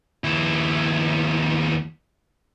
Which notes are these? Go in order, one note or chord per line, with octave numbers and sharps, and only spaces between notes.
D#2 E4